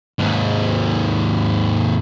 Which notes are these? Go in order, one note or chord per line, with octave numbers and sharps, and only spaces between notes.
D#2 G#2